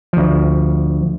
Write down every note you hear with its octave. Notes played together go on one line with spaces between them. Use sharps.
D2 F3